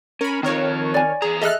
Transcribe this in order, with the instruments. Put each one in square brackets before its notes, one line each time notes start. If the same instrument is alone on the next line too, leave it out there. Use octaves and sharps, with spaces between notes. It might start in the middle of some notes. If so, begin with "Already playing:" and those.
[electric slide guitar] C#4 [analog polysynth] A#4 B5
[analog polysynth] D#3 A#4 C#5 [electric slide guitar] C4 F4
[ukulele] D5 G#5
[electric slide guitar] E2 A#5 [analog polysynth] G#4
[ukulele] G#4 D#5 E5 [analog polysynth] A4 F6 F#6